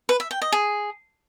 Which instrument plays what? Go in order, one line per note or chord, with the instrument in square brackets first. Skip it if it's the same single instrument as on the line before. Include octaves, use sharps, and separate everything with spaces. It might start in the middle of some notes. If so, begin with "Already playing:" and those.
[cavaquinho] B4
E5
G5
D#5
G#4